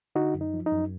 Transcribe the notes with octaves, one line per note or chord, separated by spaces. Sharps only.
D3 D#4 F#4
F#2
D#4
F3
D#4
F#2